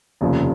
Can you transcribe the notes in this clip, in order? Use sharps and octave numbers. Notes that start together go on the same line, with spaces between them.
F1 D#2 C#3 F3